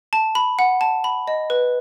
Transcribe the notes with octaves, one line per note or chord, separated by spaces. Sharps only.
A5
B5
F#5
A5
B5
D#5
B4